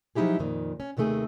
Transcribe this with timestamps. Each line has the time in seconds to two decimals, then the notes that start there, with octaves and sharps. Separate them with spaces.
0.15 F3 F#3 D#4 E4 G4 G#4
0.39 F2 A#2 D#3
0.80 C#4
0.97 D#2 C3 D#3 A3 G#4